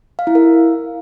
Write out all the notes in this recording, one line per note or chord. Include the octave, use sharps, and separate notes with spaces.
F5
E4
A#4